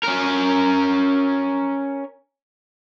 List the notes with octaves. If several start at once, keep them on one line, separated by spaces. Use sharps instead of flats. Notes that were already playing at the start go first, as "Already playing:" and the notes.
C#4 A#4